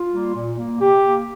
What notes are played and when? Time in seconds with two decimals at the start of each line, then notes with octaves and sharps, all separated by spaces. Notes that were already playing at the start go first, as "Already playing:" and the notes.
Already playing: F4
0.11 G3 A#3
0.34 A#2
0.58 A#3
0.81 C3 G4
1.04 A#3